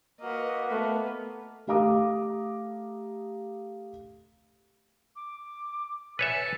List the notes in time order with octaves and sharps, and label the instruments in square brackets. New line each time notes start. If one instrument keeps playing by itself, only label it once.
[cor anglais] A#3 [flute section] F#4 B4 F#5 [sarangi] D#5
[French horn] A3 [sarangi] B3
[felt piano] A3 G4 F5 A#5 D6 D#6
[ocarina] D6
[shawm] A4 [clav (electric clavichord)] B4 C#5 E5 [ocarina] G#5